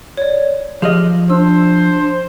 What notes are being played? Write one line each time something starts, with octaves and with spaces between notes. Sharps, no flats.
C#5 D5
F3 G4 G#4 D#5 F6
D4 C5 E6